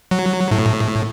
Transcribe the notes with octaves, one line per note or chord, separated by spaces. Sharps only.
F#3
A2